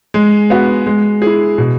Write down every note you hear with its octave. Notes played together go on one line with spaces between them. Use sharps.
G#3
B3 F#4
G#3
E4 G#4
B2